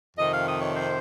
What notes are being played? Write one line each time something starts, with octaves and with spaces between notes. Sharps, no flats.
F2 C3 D#3 D#5
F5
D#5
C#5
C5